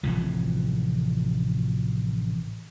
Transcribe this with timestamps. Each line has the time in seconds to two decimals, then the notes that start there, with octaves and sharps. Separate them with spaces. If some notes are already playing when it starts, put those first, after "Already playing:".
0.03 A1 C3 E3 F3